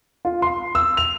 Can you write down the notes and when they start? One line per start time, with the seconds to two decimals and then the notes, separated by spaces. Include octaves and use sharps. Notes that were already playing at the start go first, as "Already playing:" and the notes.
0.25 F4
0.42 C6
0.75 E6
0.97 F7